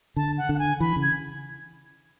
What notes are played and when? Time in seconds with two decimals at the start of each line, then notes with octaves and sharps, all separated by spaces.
0.16 D3 A5
0.38 F#5
0.49 D3
0.54 F#5
0.59 G#5
0.80 E3 B5
0.96 C#3
1.02 G#6